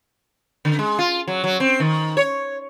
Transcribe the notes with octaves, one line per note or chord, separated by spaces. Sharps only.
D3
G#3
F4
F#3
F#3
C4
D#3
C#5